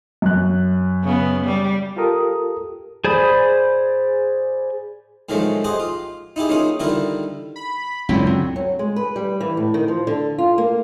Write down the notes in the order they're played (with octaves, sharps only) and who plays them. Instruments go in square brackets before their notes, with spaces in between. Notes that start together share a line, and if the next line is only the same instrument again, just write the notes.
[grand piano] F#2 F#6
[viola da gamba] C#3 B3
G3
[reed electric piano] F4 G4 A4 A#4 D#6
[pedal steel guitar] G#4 C5 D5 B5 D#6
[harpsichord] A2 D#3 F3 F#3 G#3 A3
G4 G#4 C5 D#5 F#5
F4
D#4 E4 G4 G#4
A#3 C#4 D#4 F4 G#4
D3 D#3 G3 E4 F4 A#4
[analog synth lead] B5
[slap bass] C#2 F#2 D3 [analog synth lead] F#3 [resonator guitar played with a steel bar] C4 E4 G5
[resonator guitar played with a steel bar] C4
[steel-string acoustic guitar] F#3
G#3
B4
G3
E3
A2
D#3
F3
D3
F4
A#3